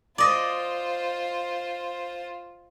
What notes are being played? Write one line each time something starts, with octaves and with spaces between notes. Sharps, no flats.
F4 C5 D5 D#5